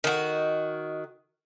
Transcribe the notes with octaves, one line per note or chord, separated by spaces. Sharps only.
D#3 F#4